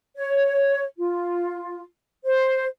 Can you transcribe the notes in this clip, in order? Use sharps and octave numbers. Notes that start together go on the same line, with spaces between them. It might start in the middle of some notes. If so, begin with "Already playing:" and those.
C#5
F4
C5